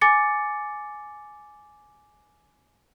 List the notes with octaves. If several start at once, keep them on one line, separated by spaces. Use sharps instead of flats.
G#5 D6 A6 C#7